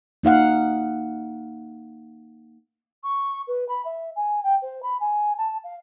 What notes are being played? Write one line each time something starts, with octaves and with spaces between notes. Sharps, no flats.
A#3 D#4 F5 F#5
C#6
B4
B5
E5
G#5
G5
C5
B5
G#5
A5
F5